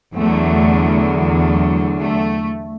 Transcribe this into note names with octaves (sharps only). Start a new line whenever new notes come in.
E2 D3 F#3 A3
A3
A3